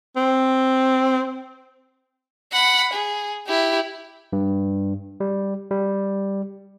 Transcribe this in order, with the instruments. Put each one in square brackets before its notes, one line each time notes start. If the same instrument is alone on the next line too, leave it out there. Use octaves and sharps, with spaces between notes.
[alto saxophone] C4
[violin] F#5 B5
G#4
E4 G4
[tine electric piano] G2
G3
G3